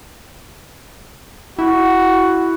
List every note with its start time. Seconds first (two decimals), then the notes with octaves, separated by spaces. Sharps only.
1.59 E4 F#4